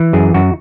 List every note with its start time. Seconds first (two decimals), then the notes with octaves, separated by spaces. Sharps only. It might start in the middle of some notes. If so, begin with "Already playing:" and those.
Already playing: E3
0.13 F#2 G#4
0.34 F#2 F#4